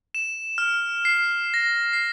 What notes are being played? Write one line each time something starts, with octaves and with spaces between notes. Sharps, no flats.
E7
F6
C7
C7
A#6
C7